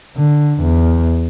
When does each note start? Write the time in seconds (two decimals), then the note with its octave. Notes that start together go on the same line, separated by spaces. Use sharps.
0.17 D3
0.62 E2